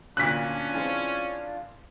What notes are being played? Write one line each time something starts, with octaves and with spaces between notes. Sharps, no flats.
D2 A#2 C#4 D4 F4 F#6 B6
E3 G#3 C4